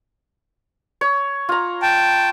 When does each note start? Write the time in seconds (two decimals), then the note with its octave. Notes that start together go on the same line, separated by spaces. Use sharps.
1.01 C#5
1.49 F4 A#5
1.82 G5 A5